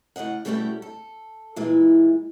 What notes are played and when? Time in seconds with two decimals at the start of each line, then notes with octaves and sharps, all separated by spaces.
0.16 A2 C#3 D#5 F#5
0.45 B2 G3 A3 C#4 E4 G4
0.82 A4
1.56 A#2 E3 G#3 E4